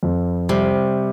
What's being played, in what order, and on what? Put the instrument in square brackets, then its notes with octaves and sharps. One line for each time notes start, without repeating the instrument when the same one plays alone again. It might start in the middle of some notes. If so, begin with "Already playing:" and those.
[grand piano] F2
[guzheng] C3 [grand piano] G3